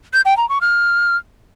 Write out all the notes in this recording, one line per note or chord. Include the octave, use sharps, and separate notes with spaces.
G6
G5
A#5
C#6
F6